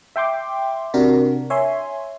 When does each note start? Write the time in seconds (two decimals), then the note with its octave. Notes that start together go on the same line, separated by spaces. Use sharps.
0.16 E5 G5 C6 D6
0.94 C3 D4 F#4 A#4
1.50 C#5 E5 G#5 C6